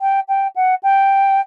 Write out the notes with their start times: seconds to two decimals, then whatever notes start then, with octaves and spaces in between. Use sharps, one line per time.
0.01 G5
0.28 G5
0.56 F#5
0.83 G5